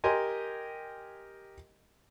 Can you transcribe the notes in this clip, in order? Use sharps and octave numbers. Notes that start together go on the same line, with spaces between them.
G4 A#4 D#5 G#5 C6